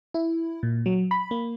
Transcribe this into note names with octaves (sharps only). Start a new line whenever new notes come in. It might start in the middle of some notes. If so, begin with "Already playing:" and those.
E4
A#2
F#3
B5
A#3